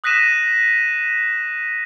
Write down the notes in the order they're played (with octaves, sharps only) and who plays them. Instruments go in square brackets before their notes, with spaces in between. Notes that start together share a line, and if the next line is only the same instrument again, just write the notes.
[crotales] D#6 F#6 A#6 B6 D#7 E7